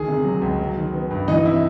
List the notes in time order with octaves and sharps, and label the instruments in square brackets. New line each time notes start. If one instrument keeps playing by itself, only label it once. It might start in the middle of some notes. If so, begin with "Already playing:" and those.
Already playing: [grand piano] D2 D#3 G#4
C3
F#3
C#2
F#3
D#3
B3
G2
E3 D#4
C3 E4